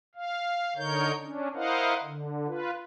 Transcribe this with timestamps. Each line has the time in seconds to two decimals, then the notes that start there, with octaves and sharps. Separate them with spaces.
0.15 F5
0.77 D3 D#4 A#4 C#5 G6
1.22 C#4 D4
1.55 E4 A#4 C5 D#5 F5 F#5
2.03 D3
2.47 F4 B4